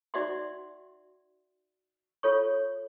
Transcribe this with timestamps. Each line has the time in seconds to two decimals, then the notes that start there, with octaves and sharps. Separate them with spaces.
0.14 D#4 F#4 D5 E5 F#5 C6
2.23 F4 A4 C#5 C#6